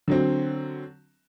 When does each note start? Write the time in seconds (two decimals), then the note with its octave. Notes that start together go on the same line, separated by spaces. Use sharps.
0.08 D3 F#3 C4